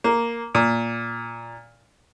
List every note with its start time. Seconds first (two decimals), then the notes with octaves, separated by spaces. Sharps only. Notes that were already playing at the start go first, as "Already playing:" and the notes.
0.04 A#3
0.55 A#2